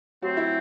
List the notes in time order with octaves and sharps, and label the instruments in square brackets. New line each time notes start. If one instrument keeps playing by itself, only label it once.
[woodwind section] F#3 A3 C4 [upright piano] F#4
[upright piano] E4